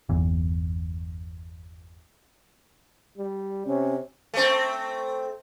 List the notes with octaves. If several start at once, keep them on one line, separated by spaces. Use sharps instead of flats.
G1 E2
G3
C3 C#4
A3 C4